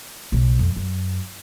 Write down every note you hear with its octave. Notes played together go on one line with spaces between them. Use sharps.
B1 C#3
F2
F#2